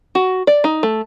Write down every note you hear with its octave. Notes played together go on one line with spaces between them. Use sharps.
F#4
D5
D#4
A3